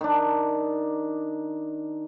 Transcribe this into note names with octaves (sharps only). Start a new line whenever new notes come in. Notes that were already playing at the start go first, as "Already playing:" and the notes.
D#3 D4